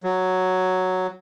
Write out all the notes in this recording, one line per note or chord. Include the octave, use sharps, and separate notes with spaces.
F#3